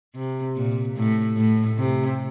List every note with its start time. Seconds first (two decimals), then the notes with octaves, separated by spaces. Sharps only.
0.15 C3
0.56 A#2
0.96 A2
1.36 A2
1.78 C3